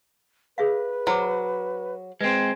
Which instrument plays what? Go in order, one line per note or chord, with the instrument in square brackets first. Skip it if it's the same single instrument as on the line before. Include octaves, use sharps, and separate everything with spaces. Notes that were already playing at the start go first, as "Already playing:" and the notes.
[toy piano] G#4 E5 F5 [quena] B4
[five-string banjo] F#3 [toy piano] C5 B5 D6
[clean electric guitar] G#3 C4 [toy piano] B4